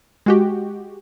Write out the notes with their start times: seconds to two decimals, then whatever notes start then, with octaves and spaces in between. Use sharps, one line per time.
0.26 G#3 F#4 G4